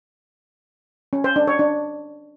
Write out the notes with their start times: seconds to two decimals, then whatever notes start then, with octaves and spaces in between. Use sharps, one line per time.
1.13 C#4
1.24 C5
1.36 D4
1.48 C#5
1.59 D4